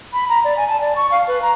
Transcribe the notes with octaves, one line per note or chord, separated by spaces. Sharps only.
B5
A#5
D5
G#5
A5
D5
C#6
F5
B4
A#5